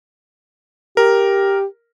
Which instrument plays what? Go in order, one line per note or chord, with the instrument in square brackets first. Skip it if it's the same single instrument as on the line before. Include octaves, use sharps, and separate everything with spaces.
[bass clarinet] G4 [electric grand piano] A#4